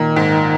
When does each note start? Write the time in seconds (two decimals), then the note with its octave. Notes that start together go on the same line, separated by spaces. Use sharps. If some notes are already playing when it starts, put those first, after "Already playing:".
Already playing: A#2 D#3
0.16 G#2